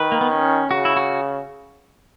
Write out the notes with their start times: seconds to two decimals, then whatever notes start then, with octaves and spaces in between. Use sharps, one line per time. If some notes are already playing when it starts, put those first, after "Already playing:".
Already playing: D#3 B4
0.12 A#3
0.21 B3
0.31 C#4
0.70 C#3 F#4
0.85 E4
0.97 F#4